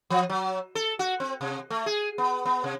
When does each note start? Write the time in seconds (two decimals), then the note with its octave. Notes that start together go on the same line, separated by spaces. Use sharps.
0.10 F3
0.30 F#3
0.75 A4
0.99 F#4
1.20 C4
1.41 C3
1.70 A3
1.86 G#4
2.18 B3
2.45 B3
2.64 C3